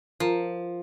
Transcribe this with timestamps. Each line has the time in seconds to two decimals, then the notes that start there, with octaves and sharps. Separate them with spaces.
0.20 F3 F4 A#4 A#5